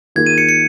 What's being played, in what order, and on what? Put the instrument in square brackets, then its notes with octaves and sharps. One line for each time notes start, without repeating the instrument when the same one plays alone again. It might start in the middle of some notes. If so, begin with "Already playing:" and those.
[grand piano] D#3 A#3 F4 G#4 [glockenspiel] G#6
[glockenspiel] D#7
C#7
C#7